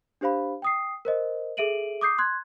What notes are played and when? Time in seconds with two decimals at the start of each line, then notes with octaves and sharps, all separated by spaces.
0.21 D4 G4 C5 F5 B5
0.62 G5 D#6 C7
1.05 A#4 C5 D#5
1.57 G#4 A4 E5 D7 D#7 F#7
2.01 D6 D#6 G6 C7
2.18 C6 F#6 G#6